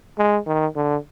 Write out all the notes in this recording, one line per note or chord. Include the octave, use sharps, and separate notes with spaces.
G#3
D#3
D3